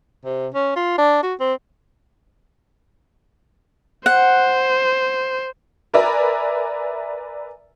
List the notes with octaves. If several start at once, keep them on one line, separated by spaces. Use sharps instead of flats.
C3
C#4
F4
D4
F#4
C4
C5 F#5
A#4 B4 D5 E5 G#5 A#5